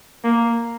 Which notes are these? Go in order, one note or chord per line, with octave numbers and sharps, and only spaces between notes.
A#3